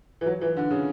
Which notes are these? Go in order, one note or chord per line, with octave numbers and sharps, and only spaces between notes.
E3
F#3
E3
D3
C#3